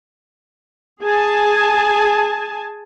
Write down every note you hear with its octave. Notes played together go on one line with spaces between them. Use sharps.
G#4 G#5 A5